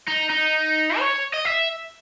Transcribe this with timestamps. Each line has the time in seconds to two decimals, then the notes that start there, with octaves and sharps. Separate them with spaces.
0.08 D#4
0.30 D#4
0.99 C#5
1.34 D#5
1.45 E5